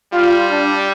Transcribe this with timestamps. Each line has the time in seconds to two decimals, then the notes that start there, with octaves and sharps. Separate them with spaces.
0.13 G3 F4
0.50 D4